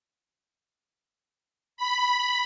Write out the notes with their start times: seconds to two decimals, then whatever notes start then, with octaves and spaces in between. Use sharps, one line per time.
1.77 B5